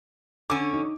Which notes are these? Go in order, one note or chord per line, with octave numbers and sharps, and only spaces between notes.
D3 C#4 D6
D#4